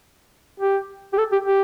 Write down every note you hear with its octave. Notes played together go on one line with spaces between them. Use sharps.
G4
G4
A4
G4
G4